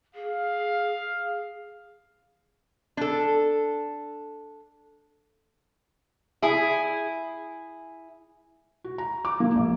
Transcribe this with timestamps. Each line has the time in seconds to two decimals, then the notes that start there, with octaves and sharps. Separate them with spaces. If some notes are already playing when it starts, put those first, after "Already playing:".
0.15 G#4 F5
2.97 D4 A4
6.42 E4 G#4
8.84 F#4
8.98 A#5
9.25 D6
9.40 A#3
9.55 A#1